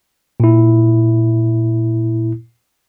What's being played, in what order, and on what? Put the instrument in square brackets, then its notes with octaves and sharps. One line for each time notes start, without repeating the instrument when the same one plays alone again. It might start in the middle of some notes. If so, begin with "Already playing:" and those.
[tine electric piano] A#2 E4